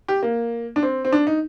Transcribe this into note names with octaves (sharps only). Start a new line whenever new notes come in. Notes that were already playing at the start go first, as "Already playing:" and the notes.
G4
A#3
D4
C4
C4
D4
D#4